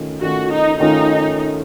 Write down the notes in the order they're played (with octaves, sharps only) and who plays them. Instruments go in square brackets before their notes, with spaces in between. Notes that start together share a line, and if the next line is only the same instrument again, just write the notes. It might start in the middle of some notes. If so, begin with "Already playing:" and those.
Already playing: [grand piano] D#3 A3 C#4 F4
[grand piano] D#3 A3 C#4 F4 [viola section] F#4
[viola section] D#4
[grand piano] D#3 A3 C#4 F4 [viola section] D#4